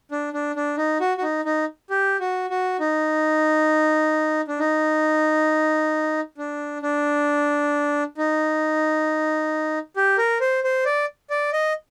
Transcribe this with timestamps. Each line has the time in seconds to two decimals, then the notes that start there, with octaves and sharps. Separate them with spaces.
0.11 D4
0.33 D4
0.56 D4
0.78 D#4
1.00 F#4
1.18 F#4
1.23 D#4
1.45 D#4
1.90 G4
2.20 F#4
2.50 F#4
2.80 D#4
4.48 D4
4.59 D#4
6.38 D4
6.82 D4
8.18 D#4
9.97 G4
10.18 A#4
10.41 C5
10.64 C5
10.85 D5
11.30 D5
11.53 D#5